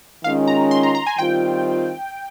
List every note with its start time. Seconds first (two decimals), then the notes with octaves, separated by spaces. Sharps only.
0.24 D#3 G#3 C#4 F4 F5
0.47 A#5
0.71 C6
0.83 A#5
0.95 A#5
1.06 G#5
1.18 D#3 G3 C4 F4 G5